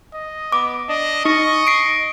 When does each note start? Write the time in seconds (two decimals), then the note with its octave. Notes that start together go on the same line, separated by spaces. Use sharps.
0.14 D#5
0.52 B3 D6
0.89 D4 D#5
1.25 D#4 D#5 C#6
1.67 C7 D7